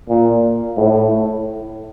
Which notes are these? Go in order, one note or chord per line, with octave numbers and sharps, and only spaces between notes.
A#2
A2